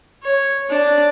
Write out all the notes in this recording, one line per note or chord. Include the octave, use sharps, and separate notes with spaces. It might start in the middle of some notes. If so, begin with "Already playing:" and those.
C#5
D4